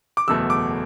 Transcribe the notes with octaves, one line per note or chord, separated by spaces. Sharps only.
D6
F#1 E2 B2 A3 E6
D6